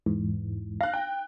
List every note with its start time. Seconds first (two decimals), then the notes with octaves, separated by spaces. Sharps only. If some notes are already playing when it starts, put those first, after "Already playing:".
0.06 E2 G#2 E3
0.81 F5 F#6 A#6
0.93 G5